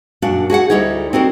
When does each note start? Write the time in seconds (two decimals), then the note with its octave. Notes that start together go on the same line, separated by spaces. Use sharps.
0.22 F#2 A#2 D4 F#4 F5
0.50 F#4 G#4 E5 F#5
0.70 D2 D#3 G3 D#4 E4 C#5
1.13 C4 D#4 F#4 A#4